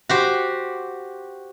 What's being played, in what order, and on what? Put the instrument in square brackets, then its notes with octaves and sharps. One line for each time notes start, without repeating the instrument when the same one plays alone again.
[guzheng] F#4 G4 C5